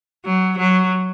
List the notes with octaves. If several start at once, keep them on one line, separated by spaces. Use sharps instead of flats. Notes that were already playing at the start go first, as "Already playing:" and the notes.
F#3
F#3